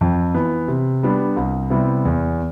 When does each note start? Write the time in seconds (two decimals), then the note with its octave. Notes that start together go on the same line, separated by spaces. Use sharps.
0.01 F2
0.35 E3 B3
0.68 C3
1.03 G3 B3 D4
1.37 C2
1.70 C3 G3 B3 E4
2.05 E2